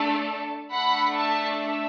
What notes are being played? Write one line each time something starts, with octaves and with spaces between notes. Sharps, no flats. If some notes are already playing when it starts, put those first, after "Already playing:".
Already playing: A3 D4 A4
A3 D4 A4 F#5 B5
E5 A5
E5